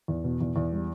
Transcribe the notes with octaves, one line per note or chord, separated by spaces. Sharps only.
E2
B2
E2
E2
G3